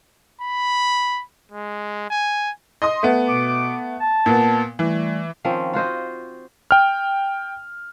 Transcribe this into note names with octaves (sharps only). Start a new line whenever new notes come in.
B5
G#3
G#5
D#5 C6 D#6
A3 B3
B2 D6
A5
A#2 A#3 B3
E3 G3 A3
D#3 F3 C4 C#4
F4 F#4 C5 D#5
G5 F6